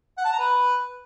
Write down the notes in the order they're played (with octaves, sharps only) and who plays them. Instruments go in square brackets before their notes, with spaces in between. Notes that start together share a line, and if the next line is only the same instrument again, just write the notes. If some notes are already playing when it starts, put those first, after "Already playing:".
[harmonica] F#5
A5
A#5
B4